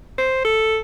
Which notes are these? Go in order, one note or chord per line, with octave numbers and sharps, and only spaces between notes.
C5
A4